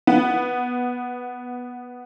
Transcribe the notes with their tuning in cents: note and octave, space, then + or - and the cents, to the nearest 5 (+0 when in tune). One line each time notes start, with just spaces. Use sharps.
B3 -5